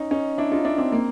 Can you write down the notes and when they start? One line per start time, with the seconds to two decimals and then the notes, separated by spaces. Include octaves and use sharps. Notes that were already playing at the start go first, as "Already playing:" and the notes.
Already playing: C#4 D#4
0.11 C#4 D#4
0.38 D4 E4
0.52 D#4 F4
0.65 D4 E4
0.78 C4 D4
0.92 A#3 C4